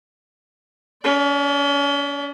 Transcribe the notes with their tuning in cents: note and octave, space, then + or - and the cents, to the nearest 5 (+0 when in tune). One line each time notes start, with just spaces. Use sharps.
C#4 +35 D5 +0